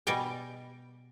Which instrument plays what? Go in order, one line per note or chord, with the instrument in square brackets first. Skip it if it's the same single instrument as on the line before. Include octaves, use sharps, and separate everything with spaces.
[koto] B2 G3 D5 D#5 G5 G#5